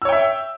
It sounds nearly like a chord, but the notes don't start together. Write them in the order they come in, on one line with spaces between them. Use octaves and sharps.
E6 C#5 G5 E5